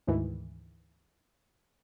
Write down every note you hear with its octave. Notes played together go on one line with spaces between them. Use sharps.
D2 G#2 D#3 E3